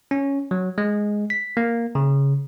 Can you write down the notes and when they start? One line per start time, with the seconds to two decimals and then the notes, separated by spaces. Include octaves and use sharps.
0.11 C#4
0.51 F#3
0.78 G#3
1.30 B6
1.57 A#3
1.95 C#3